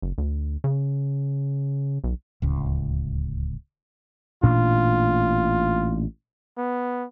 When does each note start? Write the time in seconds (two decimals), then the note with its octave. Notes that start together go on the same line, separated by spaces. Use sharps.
0.02 F#1
0.18 D2
0.64 C#3
2.04 B1
2.42 D1 C#2
4.43 A1 A#2 D4 F4
6.57 B3